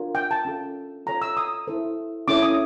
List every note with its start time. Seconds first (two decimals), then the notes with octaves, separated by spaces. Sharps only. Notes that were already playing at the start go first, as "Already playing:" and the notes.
Already playing: D4 F4 A#4 C#5
0.15 G5
0.31 A5
0.45 C#4 F4 A4
1.06 F4 A4 C#5 A#5
1.22 E6
1.37 D#6
1.67 E4 A4 C5
2.28 C#4 E4 A4 C#5 D6
2.42 D#6